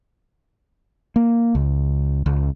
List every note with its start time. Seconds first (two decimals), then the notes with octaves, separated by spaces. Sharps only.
1.16 A#3
1.55 C#2
2.26 C#2